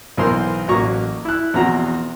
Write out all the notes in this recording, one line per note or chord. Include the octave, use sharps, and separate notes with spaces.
B1 E3 B3 A#4 C5 C6
A1 F#3 A#3 A#5 C#6
E4 F#6
E2 B2 F3 C4 F#4 A#5